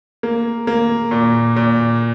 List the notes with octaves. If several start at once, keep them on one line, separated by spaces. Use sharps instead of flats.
A#3
A#3
A#2
A#2